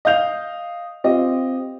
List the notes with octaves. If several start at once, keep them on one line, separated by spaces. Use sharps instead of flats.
D#5 F5 G6 F7
C4 F4 G4 D#5